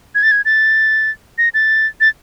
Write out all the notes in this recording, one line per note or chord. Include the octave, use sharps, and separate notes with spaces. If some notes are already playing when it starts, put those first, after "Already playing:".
G#6
A6
G#6
A6
A#6
A6
A6